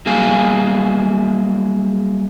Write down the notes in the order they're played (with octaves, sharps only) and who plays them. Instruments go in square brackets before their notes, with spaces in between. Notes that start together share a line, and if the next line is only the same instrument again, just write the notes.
[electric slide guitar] F#3 G3 A#3 G#4 F5 G#5